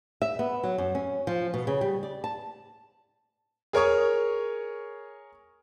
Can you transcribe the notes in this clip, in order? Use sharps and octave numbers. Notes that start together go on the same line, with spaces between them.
E5
B3
F#3
F#2
C#4
F3
B2
C#3
G3
D5
A5
G#4 A#4 C#5 C#6 D#6